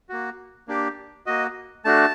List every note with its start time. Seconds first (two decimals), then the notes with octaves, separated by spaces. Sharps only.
0.09 A#3 F#4
0.68 A#3 D4 G4
1.26 A#3 F#4 D#5
1.85 A3 D4 F#4 A5